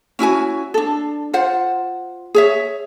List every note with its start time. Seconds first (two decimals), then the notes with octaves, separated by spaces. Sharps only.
0.19 C#4 E4 F#4 G#5
0.74 D4 A4
1.33 F4 C5 F#5
2.35 G#4 C#5 E5